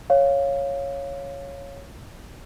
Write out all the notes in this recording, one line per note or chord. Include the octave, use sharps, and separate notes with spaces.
C#5 F5